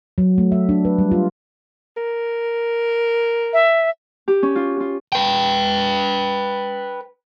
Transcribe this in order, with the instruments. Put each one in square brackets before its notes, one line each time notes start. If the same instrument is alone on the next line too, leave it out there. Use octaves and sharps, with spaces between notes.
[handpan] F#3
A3
E5
D4
B4
G3
F4
[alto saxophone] A#4
[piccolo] E5
[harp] G4
C#4
F4
F4
[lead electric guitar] B4 G5